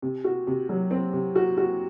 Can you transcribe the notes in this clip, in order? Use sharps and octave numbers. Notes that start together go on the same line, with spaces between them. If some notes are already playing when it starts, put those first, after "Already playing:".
C3
F#4
C3
F#3
C4
C3
F#4
F#4